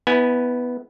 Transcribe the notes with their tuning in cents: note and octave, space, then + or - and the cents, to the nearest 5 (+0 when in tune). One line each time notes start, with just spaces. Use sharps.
B3 +0 E4 -30 G#5 +0